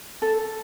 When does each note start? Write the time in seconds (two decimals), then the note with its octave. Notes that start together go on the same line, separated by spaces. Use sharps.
0.22 A4